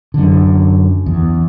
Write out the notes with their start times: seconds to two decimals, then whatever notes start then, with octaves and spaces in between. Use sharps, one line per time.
0.14 F#2 D3
1.06 E2